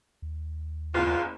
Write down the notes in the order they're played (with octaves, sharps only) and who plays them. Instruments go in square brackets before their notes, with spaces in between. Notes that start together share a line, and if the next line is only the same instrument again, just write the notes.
[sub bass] D#2
[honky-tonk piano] F#1 E2 [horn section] F4